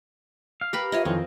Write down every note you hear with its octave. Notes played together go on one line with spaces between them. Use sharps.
F5
G4 A#4 B4 B5
F4 C#5 D#5 E5
F2 D#3 E3 C4 F4